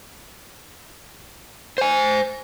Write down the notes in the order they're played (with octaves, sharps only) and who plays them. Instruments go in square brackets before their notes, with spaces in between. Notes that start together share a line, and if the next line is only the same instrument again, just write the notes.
[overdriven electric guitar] C5 G#5